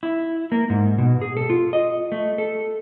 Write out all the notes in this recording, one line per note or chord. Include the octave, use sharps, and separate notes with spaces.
E4
A#3
G#2
B2
G#4
A4
F4
D#5
A3
A4